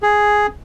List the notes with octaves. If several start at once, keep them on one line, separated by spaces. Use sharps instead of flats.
G#4